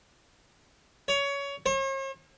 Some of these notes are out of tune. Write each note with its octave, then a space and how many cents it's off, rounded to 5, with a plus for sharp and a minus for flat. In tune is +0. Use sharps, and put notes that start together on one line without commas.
C#5 +20
C#5 -45